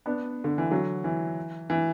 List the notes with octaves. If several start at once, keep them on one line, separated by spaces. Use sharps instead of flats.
B3 D4
D3
E3
D3 F#3
E3
E3